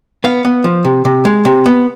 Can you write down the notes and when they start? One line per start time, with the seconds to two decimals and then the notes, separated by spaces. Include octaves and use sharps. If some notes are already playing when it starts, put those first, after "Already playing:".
0.24 B3 F5
0.45 B3
0.64 F3
0.85 C3
1.05 C3
1.25 G#3
1.45 C3
1.66 B3